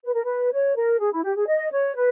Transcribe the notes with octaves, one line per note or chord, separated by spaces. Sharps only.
B4
A#4
B4
C#5
A#4
G#4
E4
G4
G#4
D#5
C#5
B4